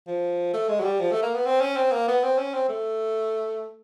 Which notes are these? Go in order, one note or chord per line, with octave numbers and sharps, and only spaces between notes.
F3
A3
G#3
F#3
G3
F3
A3
A#3
B3
C4
C#4
C4
A#3
B3
C4
C#4
C4
A3